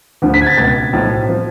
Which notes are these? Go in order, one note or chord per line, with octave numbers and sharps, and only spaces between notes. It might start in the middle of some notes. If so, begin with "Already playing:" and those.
D2 D3 F3
B6
G#6
A6
C#2 B2 A6
B1 A2 F3
F3